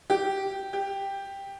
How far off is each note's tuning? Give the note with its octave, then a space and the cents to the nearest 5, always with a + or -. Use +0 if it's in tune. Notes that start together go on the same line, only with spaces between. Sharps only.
G4 -10
G4 +5